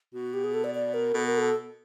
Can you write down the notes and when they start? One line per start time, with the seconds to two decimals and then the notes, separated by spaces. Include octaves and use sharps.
0.13 B2 F#4
0.33 G4
0.44 G#4
0.54 A4
0.64 D5
0.74 D5
0.94 A#4
1.14 B2 A4
1.26 A#4
1.38 A4